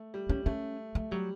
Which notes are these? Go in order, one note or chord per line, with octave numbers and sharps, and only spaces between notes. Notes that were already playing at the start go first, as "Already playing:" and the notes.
Already playing: A3
G3
G3 C#4
A3 C#4
A3
F#3 G3